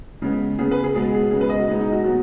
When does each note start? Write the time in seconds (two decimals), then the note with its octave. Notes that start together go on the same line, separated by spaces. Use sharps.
0.22 C#3 G#3 B3
0.59 C#3 B3 G#4
0.71 B4
0.84 G#4
0.95 B2 G#3 B3 G#4
1.14 G#4
1.31 C#3 G#3 B3 G#4
1.41 B4
1.49 D#5
1.59 F#4
1.68 B2 G#3 B3 D#4
1.81 D#4
1.93 F#4
2.04 B2 F#3 B3 F#4